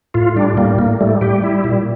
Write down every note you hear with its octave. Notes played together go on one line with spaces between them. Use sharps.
A2 F4
G3 D4
A2 A#3
A2 A#3
G3 A3
G3 G4
G3 E4
A#2